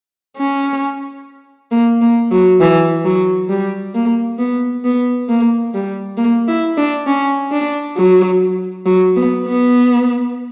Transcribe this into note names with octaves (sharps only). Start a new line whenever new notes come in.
C#4
A#3
A#3
F#3
E3
F#3
G3
A#3
B3
B3
A#3
G3
A#3
E4
D4
C#4
D4
F#3
F#3
B3
B3